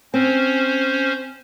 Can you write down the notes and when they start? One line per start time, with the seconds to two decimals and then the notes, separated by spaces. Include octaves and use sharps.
0.14 C4 C#4 C5